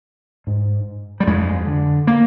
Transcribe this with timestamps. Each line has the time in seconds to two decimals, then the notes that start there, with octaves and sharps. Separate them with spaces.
0.47 G#2
1.20 G3
1.27 F2 G#3
1.67 D3
2.07 A#3